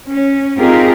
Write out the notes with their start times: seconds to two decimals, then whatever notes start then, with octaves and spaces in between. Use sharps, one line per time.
0.11 C#4
0.59 C4 D#4 F4 G4 G#4 A#4